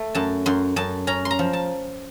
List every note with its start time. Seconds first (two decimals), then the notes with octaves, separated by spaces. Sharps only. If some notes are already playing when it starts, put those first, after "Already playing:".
Already playing: A3
0.15 F#2 A5
0.46 F#2 C6
0.76 F#2 A5
1.07 C#4 A#5
1.25 C6
1.31 A#5
1.39 F3
1.53 A5